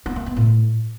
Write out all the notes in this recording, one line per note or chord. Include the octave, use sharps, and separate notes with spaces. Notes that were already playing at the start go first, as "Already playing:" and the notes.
B3
A#3
B3
A2